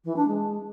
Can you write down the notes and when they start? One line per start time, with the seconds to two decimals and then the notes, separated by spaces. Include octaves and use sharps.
0.04 E3
0.16 D4
0.27 G#3